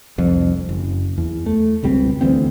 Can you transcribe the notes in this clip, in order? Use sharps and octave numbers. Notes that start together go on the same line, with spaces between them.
F1 C2 F2
F#1
E2
A3
E1 C#2 G3 C4
D2 E3 B3 C4